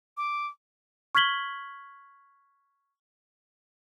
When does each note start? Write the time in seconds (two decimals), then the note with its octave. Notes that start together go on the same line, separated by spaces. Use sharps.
0.17 D6
1.15 C#6 F6 G#6 B6 F#7 G7